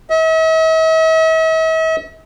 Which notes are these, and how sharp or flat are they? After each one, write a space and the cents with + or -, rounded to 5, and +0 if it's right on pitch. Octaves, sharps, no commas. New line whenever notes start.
E5 -45